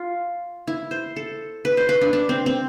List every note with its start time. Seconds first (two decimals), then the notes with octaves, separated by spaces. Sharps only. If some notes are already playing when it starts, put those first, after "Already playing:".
Already playing: F4
0.67 E4
0.91 C5
1.16 A4
1.65 B4
1.77 C5
1.89 B4
2.01 D4
2.13 D4
2.29 C4
2.46 C4